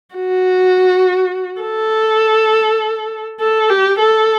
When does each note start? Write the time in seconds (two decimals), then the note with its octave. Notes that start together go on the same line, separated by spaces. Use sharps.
0.15 F#4
1.62 A4
3.40 A4
3.70 G4
3.99 A4